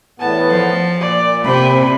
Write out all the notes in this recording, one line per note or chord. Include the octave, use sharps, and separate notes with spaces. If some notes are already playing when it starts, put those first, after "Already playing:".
E2 A2 B3 A5
F3
A#2 D5
C3 B5